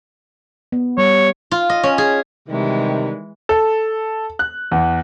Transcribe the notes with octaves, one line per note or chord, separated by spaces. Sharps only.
B3
G3 C#5
F4
D#5
C#4
G#4
C3 D#3 E3 G3 G#3
A4
F#6
E2